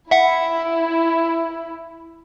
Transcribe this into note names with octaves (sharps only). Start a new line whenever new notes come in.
E4 E5 F#5